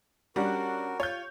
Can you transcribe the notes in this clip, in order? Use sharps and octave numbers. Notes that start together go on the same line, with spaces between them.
G3 C#4 D4 F#4 A#4 F#5
F4 C#5 G6